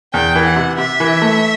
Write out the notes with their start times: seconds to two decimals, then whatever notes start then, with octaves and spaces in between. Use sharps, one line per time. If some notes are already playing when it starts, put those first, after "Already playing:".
0.14 E2 G5
0.35 E3
0.45 F#5
0.56 C3
0.78 C3 E5
1.00 E3
1.22 A3